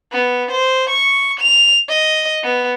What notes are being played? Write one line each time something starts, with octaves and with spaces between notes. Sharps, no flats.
B3
C5
C#6
F7
D#5
B3